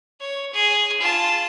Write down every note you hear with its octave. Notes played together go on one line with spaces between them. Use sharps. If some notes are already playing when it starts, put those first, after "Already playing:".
C#5
G#4
F4 A5